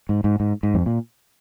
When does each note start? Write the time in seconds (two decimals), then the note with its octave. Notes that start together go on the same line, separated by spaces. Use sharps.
0.09 G#2
0.24 G#2
0.40 G#2
0.63 G#2
0.74 F2
0.86 A#2